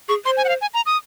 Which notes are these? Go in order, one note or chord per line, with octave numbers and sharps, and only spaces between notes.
G#4 C#6
C5 C6
G#5
F#5
F5
G#5
A#5
D#6